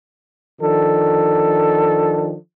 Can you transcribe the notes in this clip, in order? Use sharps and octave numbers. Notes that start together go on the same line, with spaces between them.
D#3 F3 D4 A4